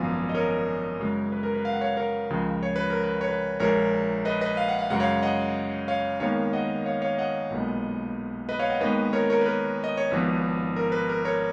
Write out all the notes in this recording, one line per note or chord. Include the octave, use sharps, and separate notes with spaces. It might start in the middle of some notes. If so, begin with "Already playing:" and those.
Already playing: G#1 F#2 F3 B3 F5 G#5
D#5
A#4 C#5
F#2 C#3 G#3
B4
A#4
B4
F5
F#5
C#5 F5
A#4 C#5
C#2 C#3 F3 G#3
C#5
B4
A#4
B4
C#5
B4
A#1 A#2 G#3 A#4 C#5
B4 D#5
B4 D#5
F5
F#5
F5
F#2 C#3 G#3 F#5
C#5 F5
D#5 F#5
C#5 F5
D#2 D#3 G#3 B3 C#5 F5
D#5 F#5
C#5 F5
C#5 F5
D#5 F#5
B1 A#2 G#3 B3
B4 D#5
C#5 F5
D#5 F#5
D#2 D#3 G#3 B3 B4 D#5
A#4 C#5
A#4 C#5
B4
A#4
D#5
C#5
G#1 G#2 F3 B3 B4
A#4
B4
A#4
A#4 C#5